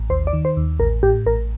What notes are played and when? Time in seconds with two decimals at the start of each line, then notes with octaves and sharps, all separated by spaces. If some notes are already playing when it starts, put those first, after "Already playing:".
Already playing: A1
0.10 D#2 C5
0.27 D5
0.33 D#3
0.45 C5
0.57 D#2
0.80 A1 A#4
1.03 A2 G4
1.26 A1 A#4